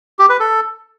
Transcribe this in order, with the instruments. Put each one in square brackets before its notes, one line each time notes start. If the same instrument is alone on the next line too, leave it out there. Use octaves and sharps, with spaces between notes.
[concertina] G4
B4
A4